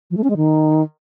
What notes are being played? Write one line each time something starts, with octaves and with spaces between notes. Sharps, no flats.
F3
A3
C#4
G#3
D#3